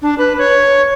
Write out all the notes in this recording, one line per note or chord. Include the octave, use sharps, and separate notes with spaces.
D4
B4
C#5